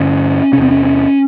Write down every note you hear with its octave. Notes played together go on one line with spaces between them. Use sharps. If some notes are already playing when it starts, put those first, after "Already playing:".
Already playing: G2 D3 C#4
C3 C#4
E2 C4
C#4
C#4